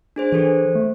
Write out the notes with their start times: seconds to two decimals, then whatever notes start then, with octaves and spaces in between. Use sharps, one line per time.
0.16 D4 G#4 C5
0.32 E3 G4 A4 C5
0.75 A3